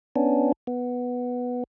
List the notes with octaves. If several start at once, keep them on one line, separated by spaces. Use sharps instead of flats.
B3 C#4 D4
B3